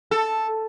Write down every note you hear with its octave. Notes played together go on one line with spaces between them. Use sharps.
A4